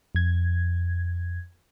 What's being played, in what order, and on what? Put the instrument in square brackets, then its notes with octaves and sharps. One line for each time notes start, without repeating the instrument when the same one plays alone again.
[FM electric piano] F2 G#6